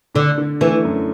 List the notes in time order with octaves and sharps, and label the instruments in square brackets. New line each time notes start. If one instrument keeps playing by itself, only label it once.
[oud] D3 [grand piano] D4
[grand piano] D3
[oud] E3 [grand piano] A3
[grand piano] F#2